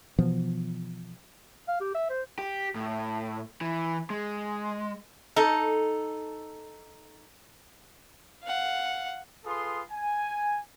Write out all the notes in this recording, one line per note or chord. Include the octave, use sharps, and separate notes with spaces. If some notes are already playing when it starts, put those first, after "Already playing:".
B2 E3 F3 B3
F5
G4
E5
C5
G4
A2
E3
G#3
D#4 A4
F5 F#5
F4 G#4 A4 B4 C6 D#6
G#5